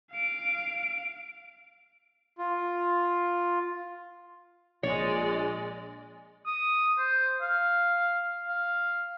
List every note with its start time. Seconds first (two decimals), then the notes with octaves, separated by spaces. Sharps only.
0.11 F5 D7
2.38 F4
4.83 A#1 G#3 C#5 D5
6.46 D#6
6.99 C5
7.42 F5
8.48 F5